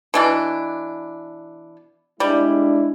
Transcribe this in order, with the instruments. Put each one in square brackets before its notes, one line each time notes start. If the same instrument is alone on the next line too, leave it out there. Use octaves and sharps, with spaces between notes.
[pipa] B2 E3 D4
[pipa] G3 [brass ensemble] G#3 D4 E4